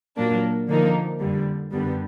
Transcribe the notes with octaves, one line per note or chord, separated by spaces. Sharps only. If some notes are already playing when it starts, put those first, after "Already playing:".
A#2 F#3 A#3 D4
D3 F3 A#3 D#4
F2 D3 G3
F#2 D3 G3 B3